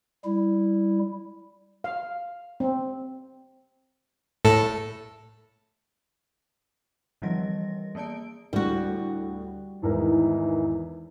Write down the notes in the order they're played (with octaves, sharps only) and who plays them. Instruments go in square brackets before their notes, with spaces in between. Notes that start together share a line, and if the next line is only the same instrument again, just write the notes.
[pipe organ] G3 E4
[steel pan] F5
C4
[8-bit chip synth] A2 A4
[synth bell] D3 E3 F3 G3 D#5 A#6
A#3 B3 D5 A5 D7
[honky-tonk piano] D2 A2 D3 [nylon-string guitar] G3 F#4
[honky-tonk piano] G#1 E2 A#4 [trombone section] D#3 E3